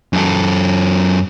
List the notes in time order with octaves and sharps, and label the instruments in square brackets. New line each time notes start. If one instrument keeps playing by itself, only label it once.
[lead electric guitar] F#2 A4